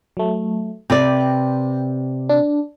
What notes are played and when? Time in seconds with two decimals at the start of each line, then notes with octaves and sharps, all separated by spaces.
0.17 F#3 A3
0.90 C3 B4 D5 G5
2.29 D4